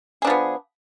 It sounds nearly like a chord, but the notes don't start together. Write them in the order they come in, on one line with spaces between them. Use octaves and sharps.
G#4 D4 F3 B3